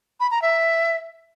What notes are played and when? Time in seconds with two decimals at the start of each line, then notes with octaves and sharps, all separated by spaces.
0.20 B5
0.31 A#5
0.42 E5